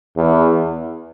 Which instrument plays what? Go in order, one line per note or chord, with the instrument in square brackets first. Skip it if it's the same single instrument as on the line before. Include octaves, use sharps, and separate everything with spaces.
[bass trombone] E2